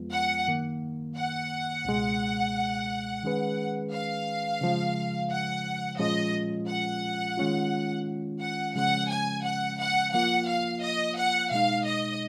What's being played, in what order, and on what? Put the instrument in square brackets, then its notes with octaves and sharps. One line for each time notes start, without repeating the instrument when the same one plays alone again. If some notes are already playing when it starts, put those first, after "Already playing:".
Already playing: [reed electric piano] F2 F3 G#3 B3 F4
[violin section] F#5
[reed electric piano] F#2 D#3 A#3
[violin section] F#5
[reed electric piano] C#2 B2 G#3
D#3 G#3 C#4 G#4 B4
[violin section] F5
[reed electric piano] C#3 F3 G#3
[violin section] F#5
[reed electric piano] A#2 F3 G#3 C#4 F4 [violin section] D#5
[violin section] F#5
[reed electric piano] D#3 G#3 C#4 F4
[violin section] F#5
[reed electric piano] C#3 F3 G#3 C#4 [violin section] F#5
[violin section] G#5
F#5
F#5
[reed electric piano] F3 A#3 F4 [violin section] F#5
[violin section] F5
D#5
F#5
[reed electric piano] B2 G#3 D#4 [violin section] F5
[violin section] D#5